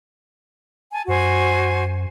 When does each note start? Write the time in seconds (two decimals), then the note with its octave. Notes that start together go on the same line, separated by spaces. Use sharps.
0.92 G#5 A5
1.08 F#2 F#4 C5 G#5